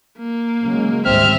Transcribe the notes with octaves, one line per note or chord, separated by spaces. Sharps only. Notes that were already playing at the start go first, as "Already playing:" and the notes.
A#3
C#3 F#3 G#3
G#1 D2 G3 C4 E5 F6